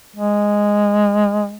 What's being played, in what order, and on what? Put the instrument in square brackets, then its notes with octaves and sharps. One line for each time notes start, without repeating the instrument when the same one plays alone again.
[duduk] G#3